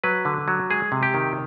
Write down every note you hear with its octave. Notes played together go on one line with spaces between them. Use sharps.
F#3 B4
D3
F#3
G#3 G#4
C3
G4
D#3